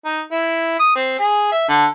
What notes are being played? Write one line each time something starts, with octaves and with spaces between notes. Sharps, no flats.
D#4
E4
D#6
C4
G#4
E5
D3